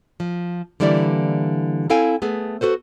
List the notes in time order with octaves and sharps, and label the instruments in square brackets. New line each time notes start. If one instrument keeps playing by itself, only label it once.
[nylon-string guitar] F3
D3 E3 G3 A#3 E4 D5
C4 E4 A4 F5 G5 G#5
A3 B3 G#4
F#4 A4 B4 C5